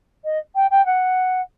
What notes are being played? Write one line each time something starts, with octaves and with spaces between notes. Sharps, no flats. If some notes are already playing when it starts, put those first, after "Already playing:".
D#5
G5
G5
F#5